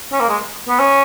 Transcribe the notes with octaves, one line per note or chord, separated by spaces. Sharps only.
C#4
A#3
G#3
B3
C#4